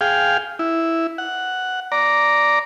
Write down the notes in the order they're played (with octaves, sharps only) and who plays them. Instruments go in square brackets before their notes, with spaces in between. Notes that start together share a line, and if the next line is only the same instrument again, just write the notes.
[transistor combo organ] G#4 F5 G5
E4
F#5
D5 A#5